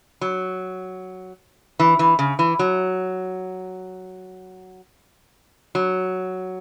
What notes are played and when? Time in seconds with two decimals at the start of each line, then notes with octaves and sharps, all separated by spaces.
0.21 F#3
1.80 E3
1.99 E3
2.19 C#3
2.39 E3
2.59 F#3
5.75 F#3